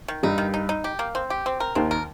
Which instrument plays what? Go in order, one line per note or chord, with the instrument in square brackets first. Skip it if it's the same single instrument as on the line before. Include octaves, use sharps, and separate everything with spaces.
[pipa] D#3
[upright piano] G2 G3 [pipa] D#4
[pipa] D#3
D#4
D#4
G4
A#3
C4
G4
C4
A#4
[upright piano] D#2 D#3 [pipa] C4
[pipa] A#4